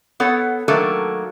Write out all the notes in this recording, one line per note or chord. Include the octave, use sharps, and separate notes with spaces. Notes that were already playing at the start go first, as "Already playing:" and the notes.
B3 A4 C#5 F#5
D#3 F#3 A3 A#3 D4 A4